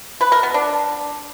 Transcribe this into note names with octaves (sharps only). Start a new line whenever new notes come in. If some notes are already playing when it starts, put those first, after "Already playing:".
B4
A#4
B3
D4